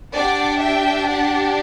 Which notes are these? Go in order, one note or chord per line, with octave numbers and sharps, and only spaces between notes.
D4 G4 D5 F#5
E5 G5
D5 F#5